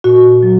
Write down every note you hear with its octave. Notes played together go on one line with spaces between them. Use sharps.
A#2 F#4
F#3